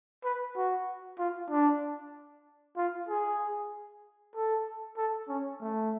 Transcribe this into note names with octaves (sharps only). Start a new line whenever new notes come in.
B4
F#4
F4
D4
F4
G#4
A4
A4
C#4
A3